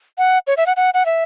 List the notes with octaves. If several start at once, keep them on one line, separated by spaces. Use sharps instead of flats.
F#5
C#5
E5
F#5
F#5
F#5
E5